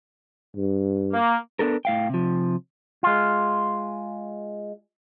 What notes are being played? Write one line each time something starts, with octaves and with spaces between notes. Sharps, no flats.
G2
A#3
B3 D4 A4 A#4
A2 F5 G5
C3 F3
G#3 F4